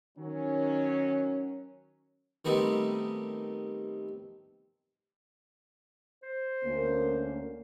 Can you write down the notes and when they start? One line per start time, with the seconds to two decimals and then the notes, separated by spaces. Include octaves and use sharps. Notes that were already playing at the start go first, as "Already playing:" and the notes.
0.18 D#3 F#3 C#4
2.45 D#3 G3 A3 B3 C4 D#4
6.23 C5
6.64 D2 A#3 C#4